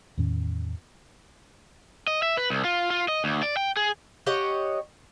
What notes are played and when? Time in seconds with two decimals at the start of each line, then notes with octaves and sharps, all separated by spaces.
0.17 E2 A2 D#3 C#4
2.07 D#5
2.22 E5
2.37 B4
2.50 C2
2.65 F4
2.90 F4
3.08 D#5
3.24 D2
3.43 D5
3.57 G5
3.77 G#4
4.26 G4 C#5 D#5 F#5